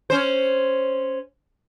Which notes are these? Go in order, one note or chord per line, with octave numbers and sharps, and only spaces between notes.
C#4 C5